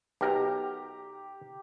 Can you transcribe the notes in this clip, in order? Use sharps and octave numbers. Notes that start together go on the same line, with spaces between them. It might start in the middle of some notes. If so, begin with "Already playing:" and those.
B1 G4 A#4 A#5